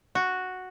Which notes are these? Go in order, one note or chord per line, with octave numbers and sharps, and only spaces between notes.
F#4